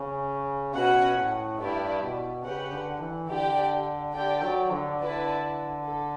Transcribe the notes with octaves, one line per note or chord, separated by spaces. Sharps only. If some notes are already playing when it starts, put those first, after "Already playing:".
Already playing: C#3
B2 C#4 F#4 B4 F#5
A2
G2 E4 G4 B4 D5
B2
C#3 G4 B4 F#5
D3
E3
D3 G4 D5 G5
D3 G4 D5 G5
F#3
D3
E4 B4 D5 A5
A4